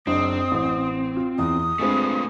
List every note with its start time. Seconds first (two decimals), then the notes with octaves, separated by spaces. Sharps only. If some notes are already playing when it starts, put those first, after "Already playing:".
0.07 F#1 C4 D4 D#5 D#6
0.52 A1
1.16 F4
1.39 E2 D#6
1.79 G#3 A3 C4 D4 F4 B4